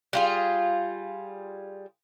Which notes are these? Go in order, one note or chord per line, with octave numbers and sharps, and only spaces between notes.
G3 F4 G#4